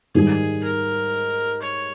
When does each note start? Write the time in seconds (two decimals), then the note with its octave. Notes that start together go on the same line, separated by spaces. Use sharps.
0.15 G#2 D#3 G3 G#4
0.63 A#4
1.62 C#5